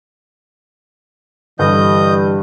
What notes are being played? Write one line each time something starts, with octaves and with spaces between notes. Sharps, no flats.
G2 D3 E3 G3 D#5 G6